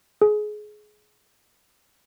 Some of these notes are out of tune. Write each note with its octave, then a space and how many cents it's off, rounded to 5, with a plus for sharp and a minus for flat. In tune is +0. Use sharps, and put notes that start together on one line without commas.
G#4 +25